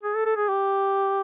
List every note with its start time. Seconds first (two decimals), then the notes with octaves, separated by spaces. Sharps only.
0.03 G#4
0.15 A4
0.26 A4
0.36 G#4
0.48 G4